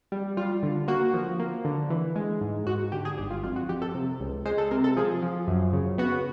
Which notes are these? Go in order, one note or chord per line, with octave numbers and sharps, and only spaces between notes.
G3
G3 F4
D3
A#3 F#4
F3
A#3
D3
E3
G#3
G#2
G#2 F#4
D3 G4
G#4
G1 G4
F4
F2 F4
F#4
F2 G4
A4
C3
C#2
G#3 C5
A4
C3 A#4
A4
F3 G#4
F3
F#2
C#3
B3 F#4